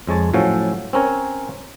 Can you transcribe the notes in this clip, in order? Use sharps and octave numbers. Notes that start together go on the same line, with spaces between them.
F2 G#3 C#5 A5
A2 F3 F#3 C#4 A4
C4 C#4 A#4 C#5